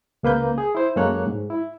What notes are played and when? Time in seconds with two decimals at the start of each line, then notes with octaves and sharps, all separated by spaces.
0.23 C#2 A#3 B4 G6
0.58 G#4
0.75 E4 C5
0.96 F#2 G#3 A#3 A4 C#5 F#6
1.27 G#2
1.50 E4